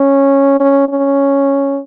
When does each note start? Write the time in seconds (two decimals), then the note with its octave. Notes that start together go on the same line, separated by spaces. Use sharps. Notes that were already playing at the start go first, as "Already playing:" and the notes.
Already playing: C#4
0.60 C#4
0.89 C#4